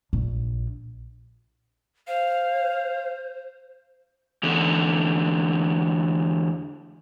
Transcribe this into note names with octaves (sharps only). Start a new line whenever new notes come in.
A#1
C5 F5
E2 D3